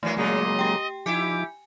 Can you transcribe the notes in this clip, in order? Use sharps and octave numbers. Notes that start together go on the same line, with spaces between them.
E3 F#3 A3 A#3 G#5 C7
A#2 C#3 F#3 G#3 A#3 D#5
G4 G5
F3 D#4 E4 G4 G#5 D6